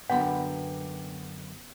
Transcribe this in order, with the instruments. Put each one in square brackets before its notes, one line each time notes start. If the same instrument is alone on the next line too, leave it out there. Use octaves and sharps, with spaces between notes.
[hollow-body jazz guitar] F#2 D3 B5 [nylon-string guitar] B3 [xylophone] F#5 [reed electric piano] G5